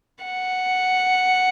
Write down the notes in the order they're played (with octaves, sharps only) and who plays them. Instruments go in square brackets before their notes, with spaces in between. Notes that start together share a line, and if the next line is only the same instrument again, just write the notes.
[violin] F#5